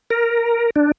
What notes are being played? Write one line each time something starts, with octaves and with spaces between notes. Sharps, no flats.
A#4
D4